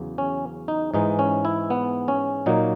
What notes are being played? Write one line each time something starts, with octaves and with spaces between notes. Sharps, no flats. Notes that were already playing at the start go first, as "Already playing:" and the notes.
Already playing: E2 C#3 F#3
C#4
D#4
G#2 E3 G#3 D#4
C#4
E4
B3
C#4
A#2 F#3 A#3 D#4